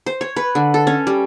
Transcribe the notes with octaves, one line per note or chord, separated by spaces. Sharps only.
C5
C#5
B4
D3
A4
C#4
G3